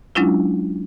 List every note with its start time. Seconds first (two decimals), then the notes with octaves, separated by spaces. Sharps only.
0.15 F#3 G#3 C#4 D4 E4 F4